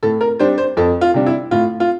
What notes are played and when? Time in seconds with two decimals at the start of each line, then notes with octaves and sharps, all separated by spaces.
0.03 A2 A4
0.21 A#4
0.39 G3 D4 C5
0.58 C5
0.77 F2 A4
1.01 F4
1.14 C3 G3 D4
1.27 E4
1.51 A2 F4
1.80 F4